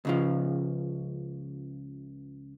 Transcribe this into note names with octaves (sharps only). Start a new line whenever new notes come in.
C#2 C#3 F3